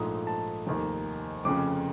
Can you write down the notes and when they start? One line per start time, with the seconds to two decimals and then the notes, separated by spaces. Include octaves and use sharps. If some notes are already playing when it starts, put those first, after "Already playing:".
Already playing: A#1 G#2 F3 A3 D#6
0.27 A5
0.67 F1 D#2 D#3
1.45 F1 F2 C#3 D6